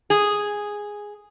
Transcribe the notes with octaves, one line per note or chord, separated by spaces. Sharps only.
G#4